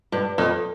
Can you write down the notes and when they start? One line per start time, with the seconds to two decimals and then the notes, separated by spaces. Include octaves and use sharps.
0.12 G2
0.38 F2